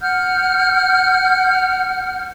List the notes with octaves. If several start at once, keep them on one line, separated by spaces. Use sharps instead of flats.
F#5 F6 G6